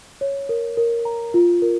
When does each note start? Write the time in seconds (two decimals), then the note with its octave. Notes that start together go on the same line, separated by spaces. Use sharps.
0.21 C#5
0.49 A#4
0.77 A#4
1.05 A#5
1.34 F4
1.62 A#4